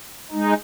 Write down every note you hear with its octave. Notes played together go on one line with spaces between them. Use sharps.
G#3 D#4